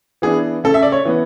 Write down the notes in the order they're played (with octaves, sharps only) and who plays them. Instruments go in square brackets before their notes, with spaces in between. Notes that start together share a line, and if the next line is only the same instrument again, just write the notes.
[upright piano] E3 B3 D4 G#4
C#3 A4
E5
D5
C#5
E3 B3